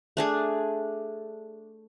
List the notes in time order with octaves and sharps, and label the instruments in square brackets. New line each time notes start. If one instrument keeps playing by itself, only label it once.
[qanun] A3 D4 G#4